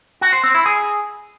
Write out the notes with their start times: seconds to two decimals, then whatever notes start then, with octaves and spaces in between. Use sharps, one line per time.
0.21 F#4
0.32 C5
0.44 C4
0.55 E4
0.66 G#4